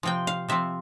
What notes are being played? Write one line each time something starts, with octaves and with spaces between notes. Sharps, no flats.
C3 F3 C4 G5
F5
C3 F3 C4 E5